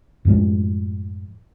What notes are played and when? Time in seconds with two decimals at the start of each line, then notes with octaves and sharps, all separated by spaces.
0.25 F#2 A2 F3 G#3